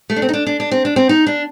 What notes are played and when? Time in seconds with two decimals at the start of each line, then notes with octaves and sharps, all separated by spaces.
0.10 A3
0.16 D4
0.22 C4
0.29 D#4
0.33 D4
0.47 D4
0.60 D4
0.71 C4
0.85 D4
0.96 C4
1.09 D#4
1.27 D4